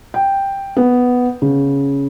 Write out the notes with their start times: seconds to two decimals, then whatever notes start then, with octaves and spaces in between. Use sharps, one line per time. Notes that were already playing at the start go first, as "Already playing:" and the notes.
0.14 G5
0.77 B3
1.42 C#3